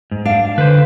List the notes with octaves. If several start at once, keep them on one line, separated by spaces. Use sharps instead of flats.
G#2
D4 F5
D3 B4 C5